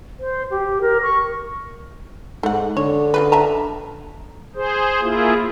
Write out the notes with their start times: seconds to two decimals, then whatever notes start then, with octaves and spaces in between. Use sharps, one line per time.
0.20 C5
0.50 G4
0.81 A#4
1.02 C#6
2.43 G#2 A3 F#5
2.77 D3 C#5
3.14 C#3 F4 B4
3.32 E5 A5 A#5
4.55 G#4 C5
5.02 A#3 E4 F4 G#4